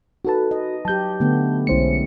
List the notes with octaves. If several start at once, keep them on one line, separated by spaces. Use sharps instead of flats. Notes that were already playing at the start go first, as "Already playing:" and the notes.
D#4 F#4 A4 B4 A5
D#5
F#3 G4 A5 G6
D3 A3 B3
B1 G#3 C#4 E4 C5 C#7